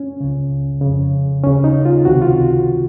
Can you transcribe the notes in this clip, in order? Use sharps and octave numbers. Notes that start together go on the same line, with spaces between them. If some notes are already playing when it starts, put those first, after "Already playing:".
Already playing: C#4
C#2 C#3
F2 C#3
D#2 C#3 C#4
D#4
F4
C#2 C3 D#3 F#4
F4